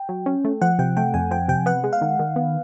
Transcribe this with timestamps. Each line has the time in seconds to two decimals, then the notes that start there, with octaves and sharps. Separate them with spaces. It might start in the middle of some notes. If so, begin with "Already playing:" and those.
Already playing: G5
0.09 F#3
0.26 C#4
0.44 A3
0.61 F3 F#5
0.79 C3 G5
0.97 A3 G5
1.14 F2 G#5
1.31 F3 G5
1.48 C3 G5
1.66 B3 F#5
1.84 G#3
1.93 F5
2.01 D#3
2.19 D#3
2.36 B3